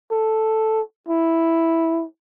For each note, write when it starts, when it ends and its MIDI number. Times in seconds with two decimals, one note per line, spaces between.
0.11 0.81 69
1.08 2.04 64